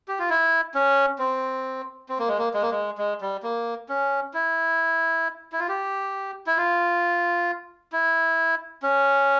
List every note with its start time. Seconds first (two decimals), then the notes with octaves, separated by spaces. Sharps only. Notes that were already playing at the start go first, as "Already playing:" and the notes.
0.08 G4
0.19 F4
0.30 E4
0.74 C#4
1.19 C4
2.09 C4
2.19 A#3
2.28 G#3
2.38 A#3
2.54 G#3
2.62 A#3
2.71 G#3
2.98 G#3
3.21 G3
3.43 A#3
3.89 C#4
4.34 E4
5.52 E4
5.59 F4
5.68 G4
6.47 E4
6.57 F4
7.92 E4
8.82 C#4